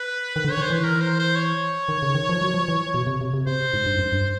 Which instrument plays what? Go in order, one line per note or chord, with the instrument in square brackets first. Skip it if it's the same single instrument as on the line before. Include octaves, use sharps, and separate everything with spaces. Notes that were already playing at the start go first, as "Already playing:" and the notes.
Already playing: [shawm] B4
[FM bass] D#3
D3
[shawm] C#5
[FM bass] D#3
[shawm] C5
[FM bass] E3 [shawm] B4
[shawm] A#4
C5
C5
C#5
[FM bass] D#3
C#3
D#3
F3
F#3
F3
E3
B2
C3
C3
C3
[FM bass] C3 [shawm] C5
[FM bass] G#2
G2
F#2
G2